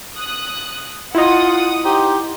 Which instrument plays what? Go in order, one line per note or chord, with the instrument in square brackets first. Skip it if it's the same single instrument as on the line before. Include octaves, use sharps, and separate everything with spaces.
[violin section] D#6 F#6
[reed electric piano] E4 D#5 [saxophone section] F4 [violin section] F#5 D#6
[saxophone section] D#4 G4 C5